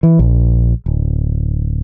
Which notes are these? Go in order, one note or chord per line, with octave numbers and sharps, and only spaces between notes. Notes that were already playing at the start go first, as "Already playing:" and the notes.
E3
A#1
D1